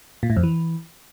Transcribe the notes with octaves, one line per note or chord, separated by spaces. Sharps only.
A#2
A2
F2
E3